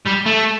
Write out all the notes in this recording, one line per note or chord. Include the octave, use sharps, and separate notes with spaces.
G3
A3